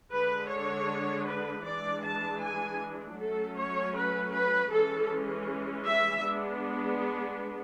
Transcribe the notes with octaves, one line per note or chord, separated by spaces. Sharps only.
D3 G#3 D4 B4
C#5
B4
E3 G#3 D4 D5
A5
G#5
F#3 A3 C#4 A4
C#5
B4
B4
E3 G#3 C#4 A4
E5
G#3 B3 D4